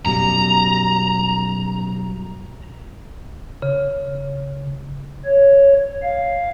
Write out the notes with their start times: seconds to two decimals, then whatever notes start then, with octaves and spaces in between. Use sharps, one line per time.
0.06 F#2 B2 G3 A#5
3.62 C#3
5.25 C#5
6.03 F5